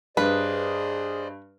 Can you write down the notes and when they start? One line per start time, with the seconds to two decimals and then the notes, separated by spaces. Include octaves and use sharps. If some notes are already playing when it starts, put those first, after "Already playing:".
0.17 G2 G#4 B4 C5 D5 D#5